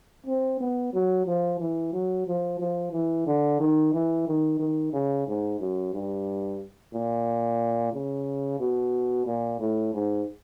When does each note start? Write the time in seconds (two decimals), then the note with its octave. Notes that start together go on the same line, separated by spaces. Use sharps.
0.27 C4
0.60 B3
0.93 F#3
1.26 F3
1.60 E3
1.93 F#3
2.27 F3
2.60 F3
2.93 E3
3.26 D3
3.60 D#3
3.94 E3
4.27 D#3
4.59 D#3
4.93 C#3
5.27 G#2
5.60 F#2
5.94 G2
6.94 A#2
7.93 C#3
8.60 B2
9.26 A#2
9.60 A2
9.94 G#2